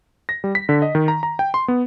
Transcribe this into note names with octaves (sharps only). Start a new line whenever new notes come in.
A#6
G3
B6
D3
D#5
D#3
A#5
A#5
G5
C6
B3